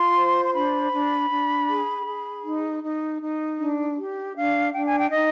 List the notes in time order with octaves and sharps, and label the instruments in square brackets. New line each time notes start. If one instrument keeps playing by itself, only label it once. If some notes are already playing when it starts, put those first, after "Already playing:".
Already playing: [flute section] F4 C6
C5
C6
D4 B5
D4
D4
G#4
G#4
D#4
D#4
D#4
D4
G4
D4 F5
D4 G5
G#5
G5
D#4 D#5